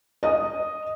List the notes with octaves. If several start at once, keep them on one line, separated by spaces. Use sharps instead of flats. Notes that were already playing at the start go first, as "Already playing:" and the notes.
D#5 D#6